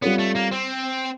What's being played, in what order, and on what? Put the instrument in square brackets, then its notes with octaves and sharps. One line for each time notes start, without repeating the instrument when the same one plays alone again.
[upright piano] G3 C4 F4 A4 C#5 [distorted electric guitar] B3
[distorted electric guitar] A3
A#3
C4